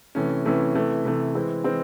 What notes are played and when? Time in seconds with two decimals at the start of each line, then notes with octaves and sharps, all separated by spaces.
0.15 C3 E3 A3 C#4
0.45 C3 E3 A3 C#4
0.75 C3 E3 A3
1.05 C3 E3 A3
1.35 E3 G#3 C4
1.64 E3 G#3 C4